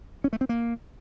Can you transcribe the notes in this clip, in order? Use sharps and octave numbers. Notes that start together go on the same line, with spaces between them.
C#4
A3
C4
A#3